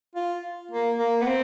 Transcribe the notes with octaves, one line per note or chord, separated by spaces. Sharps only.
F4
A#3
A#3
B3
C4